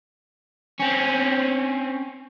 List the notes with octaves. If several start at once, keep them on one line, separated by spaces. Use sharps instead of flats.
C4 C#4